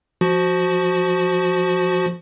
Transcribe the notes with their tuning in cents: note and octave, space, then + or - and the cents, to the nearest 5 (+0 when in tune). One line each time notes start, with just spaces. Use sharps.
F3 +0 F#4 +0